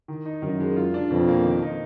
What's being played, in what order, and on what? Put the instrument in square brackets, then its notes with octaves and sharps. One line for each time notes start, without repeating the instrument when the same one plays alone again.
[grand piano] D#3
D#4
[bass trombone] F#2 [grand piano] D#3
[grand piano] G#3
F4
D4
[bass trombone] F2 [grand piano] B2
[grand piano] A#3
D#3
D#4